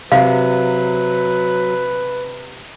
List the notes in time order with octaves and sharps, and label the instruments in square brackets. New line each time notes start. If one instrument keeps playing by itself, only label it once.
[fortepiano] C3 [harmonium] F#3 [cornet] B4 [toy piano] F5